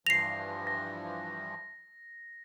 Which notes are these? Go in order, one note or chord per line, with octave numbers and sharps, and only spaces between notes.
G2 E3 F3 A#6 C7 F7
A#6